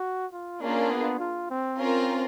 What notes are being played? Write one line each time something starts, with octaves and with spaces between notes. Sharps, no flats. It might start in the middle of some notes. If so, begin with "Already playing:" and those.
Already playing: F#4
F4
A#3 C#4 D4 F4 G#4
B3
F4
C4
C4 C#4 F4 A#4